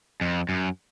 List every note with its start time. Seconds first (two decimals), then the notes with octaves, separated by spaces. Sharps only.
0.21 F2
0.49 F#2